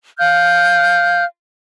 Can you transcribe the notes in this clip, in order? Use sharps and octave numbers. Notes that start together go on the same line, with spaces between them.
F5 F6 G6